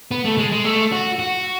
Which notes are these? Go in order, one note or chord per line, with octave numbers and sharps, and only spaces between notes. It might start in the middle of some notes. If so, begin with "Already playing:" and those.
B3
A3
G#3
G#3
A3
F#4
F#4